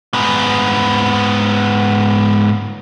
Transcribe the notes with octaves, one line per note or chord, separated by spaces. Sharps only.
G#2 B3